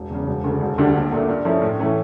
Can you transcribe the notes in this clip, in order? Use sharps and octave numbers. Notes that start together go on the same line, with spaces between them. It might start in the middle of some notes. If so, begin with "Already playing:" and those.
Already playing: E1
E2 C#3
E1
D2 C#3
E1
D2 D3 G3 D4
A#1
A#2 A3
G2
F3 A3 C#4 E4
A2
E3 A3 C#4